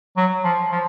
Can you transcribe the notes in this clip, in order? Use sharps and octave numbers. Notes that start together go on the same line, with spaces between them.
F#3
F3
F3